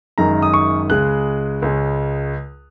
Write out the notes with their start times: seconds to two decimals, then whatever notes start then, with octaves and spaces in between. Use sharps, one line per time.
0.18 F#1 F#2 D#3 G#3 A#5
0.42 D#6
0.54 C#6
0.90 C#2 C#3 G#3 F#6
1.62 C#2 C#3 G#3